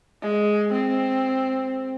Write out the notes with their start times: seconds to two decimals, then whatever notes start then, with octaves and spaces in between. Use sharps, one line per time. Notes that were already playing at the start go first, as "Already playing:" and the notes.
0.22 G#3
0.73 C4